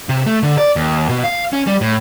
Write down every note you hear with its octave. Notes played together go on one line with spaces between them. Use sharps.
C3
A3
D3
D5
D#2
B2
F5
C#4
G3
A2